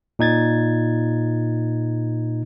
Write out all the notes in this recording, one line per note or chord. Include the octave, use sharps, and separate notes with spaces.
A#2 D#4 G#6 A6